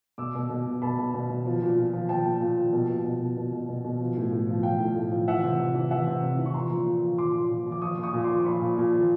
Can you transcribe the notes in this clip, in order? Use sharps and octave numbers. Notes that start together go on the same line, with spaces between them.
B2 D6 E6
B2
B2
B2
B2 A5 B5
B2
B2
B2
F3
A#2
A#2
F3
F3 G5 A5
A#2
A#2
F3
B2
B2
B2
B2
B2
B2
B2
B2
F3
A2
A2
F3
F3 F5 G5
A2
A2
F3
E3 E5 F#5
C3
C3
E3
E3 E5 F#5
C3
C3
E3
C#6
F3 A#5 C6
A#2
A#2
F3
F3 C6 D6
A#2
A#2
F3
D6
F3 C#6 D#6
A#2
C#6 D#6
A#2
F3 C6 D6
F3 B5 C#6
A#2
A#2
F3